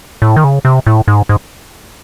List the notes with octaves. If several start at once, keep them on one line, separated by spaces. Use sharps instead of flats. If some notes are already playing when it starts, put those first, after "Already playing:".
A2
D#3
C#3
C3
A2
G#2
G#2